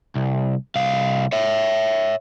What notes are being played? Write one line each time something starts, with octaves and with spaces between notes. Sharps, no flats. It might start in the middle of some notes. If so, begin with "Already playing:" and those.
C2
C2 F5
C#5 E5